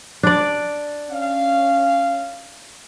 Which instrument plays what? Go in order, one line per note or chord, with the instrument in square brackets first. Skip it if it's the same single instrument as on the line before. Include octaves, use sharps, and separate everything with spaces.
[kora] D4 D5
[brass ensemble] C#4 F5